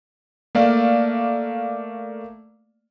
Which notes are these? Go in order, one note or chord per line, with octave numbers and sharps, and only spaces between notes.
A3 A#3 D5 F5